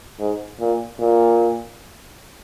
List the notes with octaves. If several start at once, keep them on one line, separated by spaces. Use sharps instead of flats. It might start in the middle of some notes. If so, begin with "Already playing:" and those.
G#2
A#2
A#2